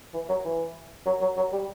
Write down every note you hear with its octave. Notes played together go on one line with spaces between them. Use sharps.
E3
F#3
E3
F#3
F#3
F#3
G3